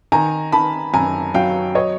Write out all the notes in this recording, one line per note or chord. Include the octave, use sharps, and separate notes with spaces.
D#3 G#5 A#5
D#3 A5 B5
F#2 G#5 A#5
F#3 F5 G5
C#5 D#5